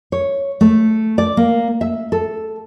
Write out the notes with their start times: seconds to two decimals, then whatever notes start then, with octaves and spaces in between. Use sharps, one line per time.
0.12 C#5
0.61 A3
1.18 D5
1.37 A#3
1.81 E5
2.12 A4